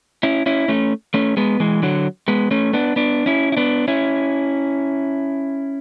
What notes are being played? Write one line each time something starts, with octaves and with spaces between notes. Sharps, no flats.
C#4 E4
C#4 E4
A3 C#4
A3 C#4
G#3 B3
E3 G#3
D3 F#3
G#3 B3
A3 C#4
B3 D4
B3 D4
C#4 E4
E4
B3 D4
C#4 E4